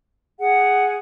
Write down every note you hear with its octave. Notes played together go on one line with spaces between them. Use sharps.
G#4 F#5